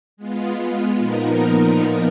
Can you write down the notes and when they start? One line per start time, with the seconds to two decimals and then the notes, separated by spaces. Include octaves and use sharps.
0.17 G#3 B3 F4
0.98 A#2 F3 B3 D#4 A#4